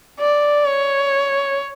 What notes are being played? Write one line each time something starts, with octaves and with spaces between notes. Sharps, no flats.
D5
C#5